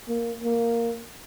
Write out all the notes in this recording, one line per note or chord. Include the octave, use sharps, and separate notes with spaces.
A#3
A#3